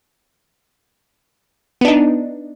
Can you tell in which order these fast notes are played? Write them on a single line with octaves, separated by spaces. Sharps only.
B3 D4 D#4